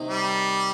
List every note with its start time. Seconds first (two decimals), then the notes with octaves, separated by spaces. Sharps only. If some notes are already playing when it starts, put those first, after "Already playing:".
Already playing: C3 D#3 A#3 D#4
0.08 G3